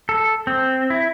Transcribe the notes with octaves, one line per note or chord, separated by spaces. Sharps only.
A4
C4
E4